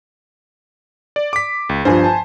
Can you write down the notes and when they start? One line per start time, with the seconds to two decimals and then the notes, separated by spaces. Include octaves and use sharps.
1.16 D5
1.33 D6 B6
1.69 C#2
1.85 G2 F3 C5 G#5
2.04 A5